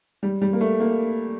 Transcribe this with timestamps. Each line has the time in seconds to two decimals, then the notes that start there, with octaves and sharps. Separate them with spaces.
0.23 G3
0.42 G3
0.53 A#3
0.61 A3
0.80 A#3